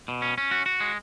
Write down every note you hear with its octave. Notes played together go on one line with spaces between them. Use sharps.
B2
C#4
C#4
F#4
F#4
G#3